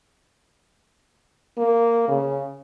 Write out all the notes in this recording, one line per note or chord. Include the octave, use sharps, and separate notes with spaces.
A#3
C#3